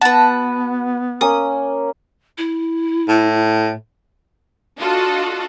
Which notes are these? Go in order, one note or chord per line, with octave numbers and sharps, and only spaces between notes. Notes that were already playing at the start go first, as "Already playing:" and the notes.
B3 F#4 B4 A5
A#3 C#4 G#5 D#6
E4
A2
D4 F4 F#4 A4 D#5